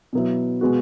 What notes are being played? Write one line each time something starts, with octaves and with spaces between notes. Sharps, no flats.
B2 F#3 B3 E4
B2 G#3 B3 F#4